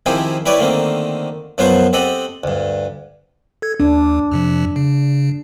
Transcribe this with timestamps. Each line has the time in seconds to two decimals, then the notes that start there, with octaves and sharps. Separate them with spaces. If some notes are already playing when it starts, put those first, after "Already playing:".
0.06 D#3 F3 C4 E4 G4 G#4
0.46 G3 E4 G4 B4 C#5 D5
0.58 D3 D#3 A3 A#3 C4
1.58 F#2 F3 F#3 B3 F4 C5
1.93 C4 G4 A4 D#5 F#5
2.44 D2 G2
3.62 A4 G#6
3.80 D#2 D4
4.31 F2 C3 F3
4.76 C#3